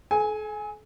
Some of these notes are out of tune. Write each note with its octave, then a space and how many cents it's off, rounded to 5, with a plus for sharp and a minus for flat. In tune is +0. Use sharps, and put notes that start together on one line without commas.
A4 -45 G#5 +0